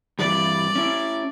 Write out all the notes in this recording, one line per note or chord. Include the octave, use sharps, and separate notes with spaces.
G2 E3 G3 D5
C#4 E4